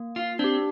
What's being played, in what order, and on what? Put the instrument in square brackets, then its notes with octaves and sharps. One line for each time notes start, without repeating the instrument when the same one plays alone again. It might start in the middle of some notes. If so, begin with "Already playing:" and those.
Already playing: [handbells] A#3
[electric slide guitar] F4
[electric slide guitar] C4 [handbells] D4 G4